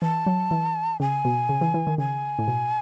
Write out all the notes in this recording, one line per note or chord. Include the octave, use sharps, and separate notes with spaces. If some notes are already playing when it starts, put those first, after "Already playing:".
E3 A5
F#3
E3
C#3 G#5
B2
C#3
E3
E3
D#3
C#3 G#5
A2
B2